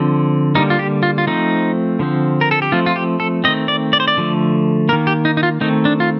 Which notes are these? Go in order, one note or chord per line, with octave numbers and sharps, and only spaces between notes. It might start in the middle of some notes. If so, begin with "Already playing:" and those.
Already playing: D3 F3 C4
D3 G3 A#3 D#4
F4
G4
F4
F4
F3 A3 C4 D#4
D3 F3 C4
A#4
A4
G4
F3 A3 C4 F4
F4
G4
A4
D#3 A3 C4 D#5
D5
D5
C5
D5
D3 F3 A3
D#3 A#3 A#4
G4
D#4
D#4
F4
D#3 A3 C4 D#4
D4
F4